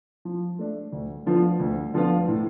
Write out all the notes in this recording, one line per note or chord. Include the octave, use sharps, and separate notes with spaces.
F3
A3 D4
D2
D3 F3 B3 F4
D2
D3 F3 B3 F4
A2